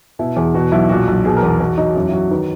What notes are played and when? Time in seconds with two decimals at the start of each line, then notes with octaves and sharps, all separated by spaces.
0.19 B2 E4
0.36 E2 G#4
0.54 B2 F#4
0.72 B1 E4
0.89 A#2 F#4
1.08 B1
1.25 B2 G#4
1.36 A#4
1.42 E2
1.60 E2 F#4
1.78 F#3 D#4
1.95 F#2 E4
2.09 E4
2.13 F#3 F#4
2.31 D#3 B4